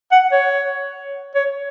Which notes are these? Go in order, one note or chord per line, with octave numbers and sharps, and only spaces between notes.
F#5
C#5
C#5